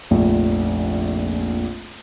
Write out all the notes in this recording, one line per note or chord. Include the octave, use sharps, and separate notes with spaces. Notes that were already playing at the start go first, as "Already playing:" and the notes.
F1 A#1